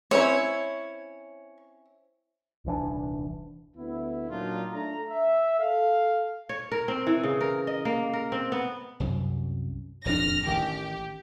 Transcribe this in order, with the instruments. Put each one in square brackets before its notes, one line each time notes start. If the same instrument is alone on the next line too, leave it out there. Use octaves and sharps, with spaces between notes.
[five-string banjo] C4 C#4 E4 [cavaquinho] C#5
[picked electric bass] D#1 C2 E3 D4
[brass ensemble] D2 B3 E4
A#2 F#3 D4 D#4 F4
A3 D4 A#5
E5
A4 F5
[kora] C#5
A#4
C4
E3
C#3
A#4
D#5
A#3
A#4
C4
B3
[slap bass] C2 F#2
[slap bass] D#1 F2 D4 [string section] F6 A#6
[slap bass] A1 D#3 [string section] G4